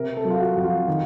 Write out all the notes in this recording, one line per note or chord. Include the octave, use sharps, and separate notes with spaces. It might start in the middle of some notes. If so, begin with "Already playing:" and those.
Already playing: C3 A#4
A4
F#3
F4
F#4
F2
F4
D#3